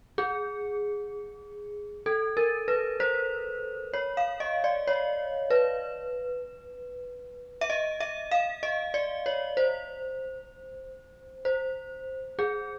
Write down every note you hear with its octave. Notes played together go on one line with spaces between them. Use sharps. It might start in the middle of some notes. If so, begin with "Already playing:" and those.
G#4
A4
A#4
B4
C5
C#5
F5
D#5
D5
C#5
B4
E5
D#5
E5
F5
D#5
D5
C#5
C5
C5
G#4